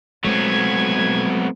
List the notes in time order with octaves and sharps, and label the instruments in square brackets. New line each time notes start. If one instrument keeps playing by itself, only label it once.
[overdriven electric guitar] F#3 B3 [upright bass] G#3 [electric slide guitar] A3 C4 [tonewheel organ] G#6